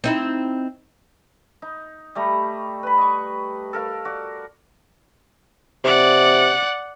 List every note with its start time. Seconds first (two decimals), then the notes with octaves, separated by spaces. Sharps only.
0.04 C4 D#4 E4
1.62 D#4
2.15 G3 A3 A#5
2.83 B4 B5
2.98 D#5 C#6
3.73 A4 A#4 F5
4.05 F#4 D5
5.85 C3 D5 F#5